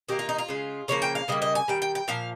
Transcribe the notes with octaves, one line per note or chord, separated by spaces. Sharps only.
D#3 A#3 G4
F4
D#4
F4
C#3 G#3
C#3 F3 A#3 C#5
G5
F5
C#3 G3 A#3 D#5
D#5
G#5
D#3 G3 G5
G5
G5
A#2 F3 F5